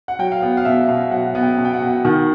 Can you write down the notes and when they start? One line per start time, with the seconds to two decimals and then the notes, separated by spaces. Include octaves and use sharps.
0.08 F#5
0.19 F#3 G5
0.32 F5
0.42 B3 F#5
0.57 F5
0.65 B2 E5
0.88 B2 F5
1.11 F#3 F#5
1.35 B3
1.43 G5
1.58 B2
1.65 G5
1.74 F#5
1.81 B2
2.05 D#3